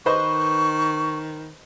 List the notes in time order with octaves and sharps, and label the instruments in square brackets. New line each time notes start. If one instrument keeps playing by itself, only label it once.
[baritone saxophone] D#3 [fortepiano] B4 C5 D#5 [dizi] C#6